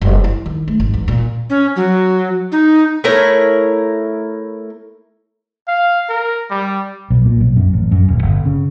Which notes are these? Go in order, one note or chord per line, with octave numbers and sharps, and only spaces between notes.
F#1
E4
D#3
A3
G#1
E2
A#2
C#4
F#3
D#4
A3 E4 A#4 C#5
F5
A#4
G3
B1
A#2
B1
F#2
A1
F#2
D#1
G1
C#3